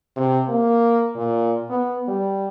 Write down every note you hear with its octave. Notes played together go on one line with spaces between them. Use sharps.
C3
A#3
A#2
B3
G3